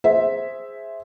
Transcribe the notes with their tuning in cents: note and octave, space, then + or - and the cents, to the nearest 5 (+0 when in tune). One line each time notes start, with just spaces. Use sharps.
G#4 +0 C5 +0 E5 +0